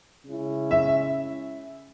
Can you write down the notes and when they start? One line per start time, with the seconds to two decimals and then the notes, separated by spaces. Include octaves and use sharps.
0.25 C#3 G#3 C#4 E4
0.71 E5